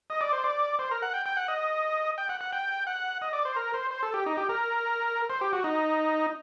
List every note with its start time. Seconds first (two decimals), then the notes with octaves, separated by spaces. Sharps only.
0.10 D#5
0.21 D5
0.32 C5
0.44 D5
0.79 C5
0.91 A#4
1.02 F#5
1.14 G5
1.26 G5
1.37 F#5
1.48 D#5
2.18 G5
2.29 F#5
2.41 F#5
2.53 G5
2.87 F#5
3.22 D#5
3.33 D5
3.45 C5
3.56 A#4
3.74 C5
3.91 C5
4.03 A4
4.14 G4
4.26 D#4
4.37 G4
4.49 A#4
5.30 C5
5.41 G4
5.53 F#4
5.64 D#4